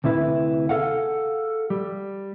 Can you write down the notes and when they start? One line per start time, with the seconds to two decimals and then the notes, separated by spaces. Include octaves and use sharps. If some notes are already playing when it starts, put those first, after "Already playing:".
0.04 D2 C3 E4 B4
0.69 G#4 A4 F5 F#5
1.70 G3